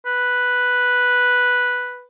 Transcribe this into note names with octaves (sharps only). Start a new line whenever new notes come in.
B4